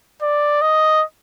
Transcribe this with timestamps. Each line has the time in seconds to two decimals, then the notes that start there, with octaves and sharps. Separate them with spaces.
0.22 D5
0.62 D#5